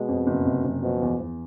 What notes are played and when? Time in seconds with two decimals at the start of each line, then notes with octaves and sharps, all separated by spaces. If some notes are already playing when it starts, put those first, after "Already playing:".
Already playing: B2 G#3
0.08 F2
0.27 F#1
0.45 C3
0.64 F#1
0.82 B2 F3
1.02 E2
1.20 E2